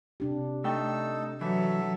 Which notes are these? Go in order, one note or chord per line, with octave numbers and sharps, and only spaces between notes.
C3 D4 G4
A3 D#4 A4 G5 E6
E3 F#3 A4 E5